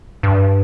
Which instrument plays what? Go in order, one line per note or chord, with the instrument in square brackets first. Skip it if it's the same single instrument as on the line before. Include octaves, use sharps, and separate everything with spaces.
[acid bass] G2